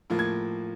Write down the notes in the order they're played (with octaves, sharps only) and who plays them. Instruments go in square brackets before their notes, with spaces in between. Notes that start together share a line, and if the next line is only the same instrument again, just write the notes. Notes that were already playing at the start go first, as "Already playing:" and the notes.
[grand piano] A2 F3 A#3
G#6